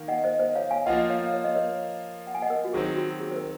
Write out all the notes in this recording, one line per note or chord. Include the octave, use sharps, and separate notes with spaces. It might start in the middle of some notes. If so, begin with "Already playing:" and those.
Already playing: D#3 A#3
D#5 F#5
C5 D#5
C5 D#5
C#5 F5
F5 G#5
F3 A#3 F4 D#5 F#5
C#5 F5
C#5
D#5
A#4 C#5
F#5
G#5
D#5 F#5
A#4
F#4
D#3 F#3 C4 G#4
F#4
G#4
C5
A#4